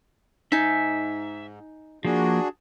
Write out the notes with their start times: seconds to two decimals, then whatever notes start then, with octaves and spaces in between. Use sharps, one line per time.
0.52 G#2 D#4 E5 G#5
2.05 F3 A#3 D4 F#4 G#4